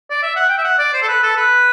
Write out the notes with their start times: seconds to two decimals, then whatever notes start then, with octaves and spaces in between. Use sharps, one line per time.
0.10 D5
0.23 E5
0.36 F#5
0.49 G5
0.58 E5
0.64 F#5
0.79 D5
0.93 C5
1.02 A4
1.08 B4
1.23 A4
1.36 B4